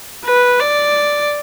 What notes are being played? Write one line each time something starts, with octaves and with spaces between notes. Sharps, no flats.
B4
D5